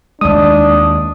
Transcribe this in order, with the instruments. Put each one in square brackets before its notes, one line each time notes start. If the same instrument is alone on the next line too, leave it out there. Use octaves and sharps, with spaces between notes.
[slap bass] D#2 G#3 [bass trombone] D4 [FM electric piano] D#6